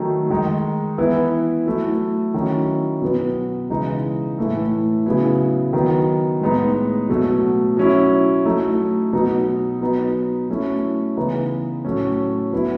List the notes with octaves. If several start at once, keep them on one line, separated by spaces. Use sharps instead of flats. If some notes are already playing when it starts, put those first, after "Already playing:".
Already playing: D#3 F#3 A3
D#3 G#3 D#4
E3 B3 E4
F#3 A3 E4
D#3 F#3 C#4 E4
B2 F#3 B3
C#3 E3 G#3 D#4
A2 E3 A3 E4
C#3 F#3 B3 E4
D#3 F#3 B3
A2 G#3 B3 D#4
B2 F#3 A3
F#3 C#4 E4
F#3 A3 D#4
B2 F#3 B3 D#4
F#3 B3 D#4
F#3 A3 C#4 E4
C#3 E3 B3 D#4
A2 F#3 A3 C#4
F#3 B3 E4